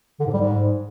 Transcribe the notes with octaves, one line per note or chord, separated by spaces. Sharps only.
D3
G#2
G3
G#2